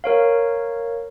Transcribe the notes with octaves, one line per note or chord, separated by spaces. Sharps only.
A#4 C#5 F5